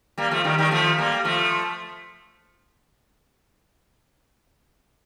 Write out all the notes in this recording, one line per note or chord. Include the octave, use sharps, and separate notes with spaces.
G3 A#3
F3 A3
D#3 G3
D#3 G3
F3 A3
G3 A#3
F3 A3